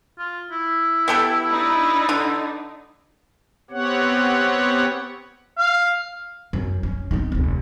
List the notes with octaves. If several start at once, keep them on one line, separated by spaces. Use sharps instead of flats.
F4
E4
B3 G4 A4
D4 D#4 B4
D3
B3 C4 G4 C#5 F#5
F5
F#2
C#4
C4 D#4
F1 D2